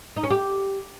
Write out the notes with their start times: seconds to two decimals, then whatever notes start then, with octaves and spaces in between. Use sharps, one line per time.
0.16 D#4
0.24 C#4
0.31 G4